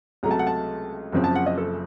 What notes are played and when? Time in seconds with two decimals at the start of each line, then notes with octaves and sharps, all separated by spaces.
0.23 C#2 C3 F#3 A3 A#5
0.31 A5
0.39 F#5
0.47 A5
1.12 F#1 F#2 C#3 F3 C4
1.24 A5
1.35 F#5
1.46 D#5
1.58 A4